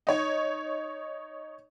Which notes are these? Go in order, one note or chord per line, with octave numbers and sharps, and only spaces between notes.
D#4 C#5